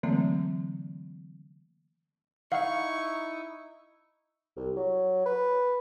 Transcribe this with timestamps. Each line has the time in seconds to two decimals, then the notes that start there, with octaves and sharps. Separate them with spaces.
0.03 D3 E3 F#3 A3 A#3 C4
2.52 D#4 E4 F5 F#5 C#6
4.56 C2
4.77 F#3
5.26 B4